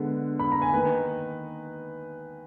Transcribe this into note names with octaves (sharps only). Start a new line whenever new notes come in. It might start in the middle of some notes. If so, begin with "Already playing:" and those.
Already playing: D3 G#3 B3
B5
A#5
G#5
D#3 A#3 B4